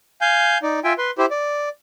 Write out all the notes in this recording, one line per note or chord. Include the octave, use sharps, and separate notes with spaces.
F5 G#5 G6
D#4 D5
F4 E5 G5 G#5
B4 C6
E4 G4 C5
D5